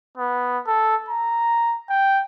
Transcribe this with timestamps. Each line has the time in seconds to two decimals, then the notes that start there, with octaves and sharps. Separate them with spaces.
0.17 B3
0.67 A4
1.08 A#5
1.89 G5